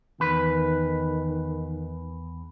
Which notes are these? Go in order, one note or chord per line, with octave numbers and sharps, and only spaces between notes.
E2 D#3 B4